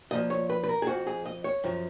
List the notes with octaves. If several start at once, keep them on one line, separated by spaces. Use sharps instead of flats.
A#2 F3 D#5
C#5
B4
B4
A#4
G#4
F2 F3 F#4
G#4
D#5
C#5
F#2 F3